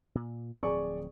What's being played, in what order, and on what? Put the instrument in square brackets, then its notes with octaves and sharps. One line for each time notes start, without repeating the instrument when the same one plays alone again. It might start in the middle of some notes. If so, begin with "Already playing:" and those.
[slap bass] A#2
[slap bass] D1 F3 C4 [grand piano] G#4 D5 C#6